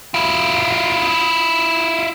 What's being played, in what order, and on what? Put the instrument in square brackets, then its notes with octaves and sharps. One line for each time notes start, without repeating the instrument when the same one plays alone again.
[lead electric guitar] E4 F4